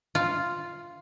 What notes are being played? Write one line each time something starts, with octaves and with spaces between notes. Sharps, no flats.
F4